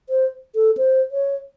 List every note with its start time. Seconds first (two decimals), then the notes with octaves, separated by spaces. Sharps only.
0.09 C5
0.55 A4
0.77 C5
1.12 C#5